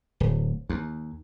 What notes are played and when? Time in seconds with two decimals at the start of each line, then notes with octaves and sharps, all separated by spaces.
0.20 D1
0.69 D#2